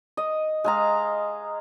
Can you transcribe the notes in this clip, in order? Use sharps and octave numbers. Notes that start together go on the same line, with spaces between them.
D#5
G#3 F5 A#5